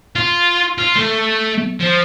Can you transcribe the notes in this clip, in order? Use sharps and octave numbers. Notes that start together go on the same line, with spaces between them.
F4
F4
A3
F3